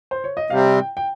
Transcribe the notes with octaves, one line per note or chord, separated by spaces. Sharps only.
C5
C#5
D#5
C3 G3 C4 F5
G5
G5